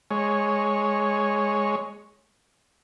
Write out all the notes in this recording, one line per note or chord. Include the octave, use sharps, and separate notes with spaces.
G#3 C#5